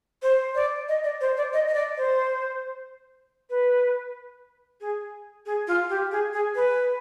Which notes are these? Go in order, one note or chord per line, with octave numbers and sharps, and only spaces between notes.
C5
D5
D#5
D5
C5
D5
D#5
D#5
D5
C5
B4
G#4
G#4
F4
G4
G#4
G#4
B4